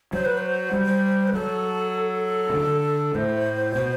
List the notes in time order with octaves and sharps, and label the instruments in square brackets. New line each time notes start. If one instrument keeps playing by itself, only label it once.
[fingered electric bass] F#3 [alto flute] C5
[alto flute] B4
C5
[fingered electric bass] G3
[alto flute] B4
[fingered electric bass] F#3 [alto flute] A4
[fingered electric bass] C3
D3
[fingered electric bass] A2 [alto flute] C5
[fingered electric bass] B2